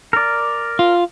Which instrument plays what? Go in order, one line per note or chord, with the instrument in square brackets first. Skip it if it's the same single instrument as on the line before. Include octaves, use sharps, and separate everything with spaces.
[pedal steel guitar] A#4 D5
[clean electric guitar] F4